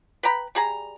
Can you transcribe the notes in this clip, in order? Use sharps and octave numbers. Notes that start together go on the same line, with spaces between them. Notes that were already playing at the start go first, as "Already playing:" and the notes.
B4 G5 A#5 B5
G3 G#4 A#5